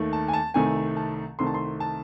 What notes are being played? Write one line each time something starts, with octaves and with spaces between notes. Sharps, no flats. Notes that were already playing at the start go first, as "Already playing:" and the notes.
Already playing: D#2 D#3 A3
A5
G#5
A5
C2 C3 D#3 A3 G#5
A5
C2 C3 D#3 A3 C6
A5
C6
A5